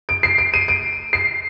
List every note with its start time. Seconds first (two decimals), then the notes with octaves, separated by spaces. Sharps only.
0.09 D7
0.23 C7
0.38 D7
0.54 D#7
0.68 D7
1.13 C7